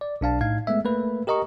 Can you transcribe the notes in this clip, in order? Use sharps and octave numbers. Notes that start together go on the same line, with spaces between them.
D5
B1 D4 F5 A5
A2 D#4 F5 G#6
G#3 A3 B3 E5
A3 A#3 B4
G4 A#4 D#5 A#5 C#6